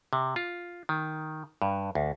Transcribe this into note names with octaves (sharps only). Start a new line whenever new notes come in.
C3
F4
D#3
G2
D2